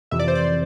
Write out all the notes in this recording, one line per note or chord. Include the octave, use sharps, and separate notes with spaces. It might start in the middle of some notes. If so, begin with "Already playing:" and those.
F2 C3 E3 E5
D5
C5
D5